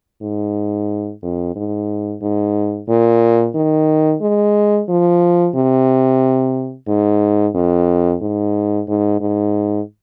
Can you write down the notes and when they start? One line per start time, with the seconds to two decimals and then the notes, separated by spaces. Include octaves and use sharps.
0.22 G#2
1.22 F2
1.55 G#2
2.22 G#2
2.89 A#2
3.55 D#3
4.21 G#3
4.89 F3
5.55 C3
6.88 G#2
7.55 F2
8.21 G#2
8.87 G#2
9.21 G#2